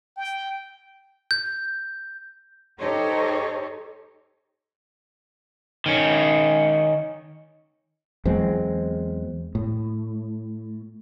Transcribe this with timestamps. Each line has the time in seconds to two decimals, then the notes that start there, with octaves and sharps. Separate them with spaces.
0.17 G5
1.31 G6
2.79 D#4 G4 A4 C5 C#5
5.86 D#3 C#4
8.25 E2 F#3 G#3 C4
9.55 A2